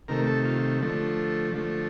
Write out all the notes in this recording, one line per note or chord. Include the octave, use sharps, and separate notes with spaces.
C3 D#3 A3 A#4
A4
F4
D3 F3 A3
D3 F3 A3